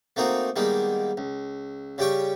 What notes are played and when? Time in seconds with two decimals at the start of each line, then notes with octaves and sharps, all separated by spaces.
0.16 A3 A#3 C4 D#4 F#4
0.56 D#3 G3 G#3 A#3 B3
1.17 C#2
1.98 C#3 G3 G4 G5 C#6